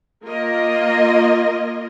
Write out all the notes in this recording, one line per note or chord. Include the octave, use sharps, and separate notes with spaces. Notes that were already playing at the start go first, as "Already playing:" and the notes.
A#3 F4 A#4 D#5